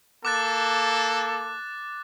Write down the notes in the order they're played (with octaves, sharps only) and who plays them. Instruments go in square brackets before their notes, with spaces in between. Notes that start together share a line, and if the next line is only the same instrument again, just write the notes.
[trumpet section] A#3 A4 [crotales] D6 F#6 A6